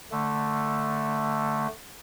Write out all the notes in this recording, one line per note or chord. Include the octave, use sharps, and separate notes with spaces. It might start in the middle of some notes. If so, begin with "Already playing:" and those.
D3 A3